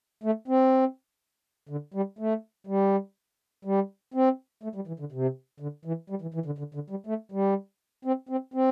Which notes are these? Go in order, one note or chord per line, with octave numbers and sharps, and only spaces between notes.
A3
C4
D3
G3
A3
G3
G3
C4
A3
G3
E3
D3
C3
D3
E3
G3
E3
E3
D3
D3
D3
G3
A3
G3
C4
C4
C4